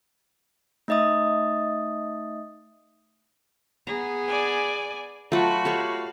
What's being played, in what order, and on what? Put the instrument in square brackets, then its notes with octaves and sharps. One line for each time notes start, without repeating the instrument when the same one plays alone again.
[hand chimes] A3 D#4 D#5 E5 D#6
[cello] B3 G#4 [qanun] A#5
[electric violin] D5 G#5
[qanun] F#3 F4 [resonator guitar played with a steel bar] A3 [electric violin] F#4 B5
[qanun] G4 A4 C#5 [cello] F5